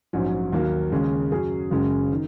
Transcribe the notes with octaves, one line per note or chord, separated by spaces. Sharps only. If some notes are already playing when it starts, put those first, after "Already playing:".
A#1 G#2 F#3 C#4
D#2 D#3 F#3 A#3
D#2 C#3 G#3 C#4
F#2 F#3 C#4 G#4
F#1 F#2 C#3 G#3 C#4
D#3